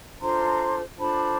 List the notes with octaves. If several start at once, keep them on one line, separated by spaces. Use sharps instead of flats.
D4 F4 A4 C5 A#5 C6
D4 F4 A4 C5 A5 B5